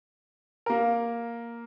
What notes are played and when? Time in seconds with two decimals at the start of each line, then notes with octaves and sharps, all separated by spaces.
0.66 A#3 A#4